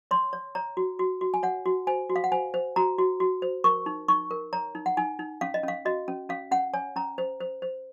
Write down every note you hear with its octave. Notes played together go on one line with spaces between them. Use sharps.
C#5 C6
C#5
C#5 A#5
F#4
F#4
F#4
G#5
C#5 F#5
F#4
C5 G#5
F#4
F5
F#5
C5 G#5
C5
F#4 A#5
F#4
F#4
C5
A#4 C#6
D#4
D#4 C#6
A#4
C#5 A#5
D#4
F#5
D#4 G#5
D#4
C#4 F5
D#5
C#4 F5
F#4 D#5
C#4
C#4 F5
C#4 F#5
C#5 G#5
C#4 A#5
C5
C5
C5